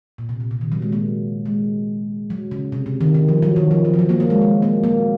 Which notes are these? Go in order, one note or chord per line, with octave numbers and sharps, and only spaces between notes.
A#2
C3
A#2
C3
D#3
F#3
G#3
F#3 A#3
G#3
F#3
C#3
C3
C3
D#3
D#3
F3
F#3
D#3
F3
F#3
F3
F#3
F#3 A#3
F#3 A#3
G#3
G#3
F#3 A#3
F#3 A#3